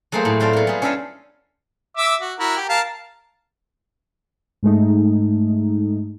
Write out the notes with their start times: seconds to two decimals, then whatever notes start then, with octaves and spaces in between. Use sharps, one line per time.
0.12 F#3 A3 A#3 G#4 C5
0.25 A2
0.40 F#3 C4 F4 A4 D5
0.53 A#3 B3
0.67 G3 G#4
0.82 C#4 D4 A4 E5 F5 G#5
1.97 E5 D6 E6
2.20 F#4
2.40 E4 F#4 A#4
2.57 G4
2.69 A#4 F5 A5
4.63 G#2 G#3 A3 D#4